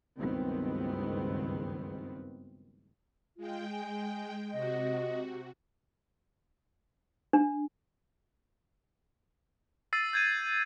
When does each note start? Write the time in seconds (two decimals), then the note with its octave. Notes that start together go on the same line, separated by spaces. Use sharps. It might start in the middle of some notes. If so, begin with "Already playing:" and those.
0.17 F#1 C#2 G2 D#3 B3 C4
3.37 G#3 F4 G5
3.72 G#5
4.52 C3 F#4 D#5
7.33 D4
9.93 E6 A6 C7 D#7
10.13 G6 G#6 D#7